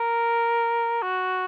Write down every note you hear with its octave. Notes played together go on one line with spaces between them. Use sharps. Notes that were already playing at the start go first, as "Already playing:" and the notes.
Already playing: A#4
F#4